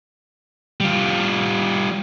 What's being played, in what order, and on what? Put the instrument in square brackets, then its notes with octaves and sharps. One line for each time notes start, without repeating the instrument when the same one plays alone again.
[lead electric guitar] G3 F4